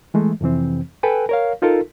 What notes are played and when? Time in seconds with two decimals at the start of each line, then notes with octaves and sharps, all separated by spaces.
0.14 E3 G#3 A3
0.41 F2 C3 E3 C4
1.03 A4 B4 G5 G#5
1.29 A#4 C#5 F5
1.62 D#4 F4 A4 A#4